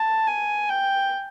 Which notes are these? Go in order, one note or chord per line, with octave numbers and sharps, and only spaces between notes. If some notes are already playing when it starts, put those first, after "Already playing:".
Already playing: A5
G#5
G5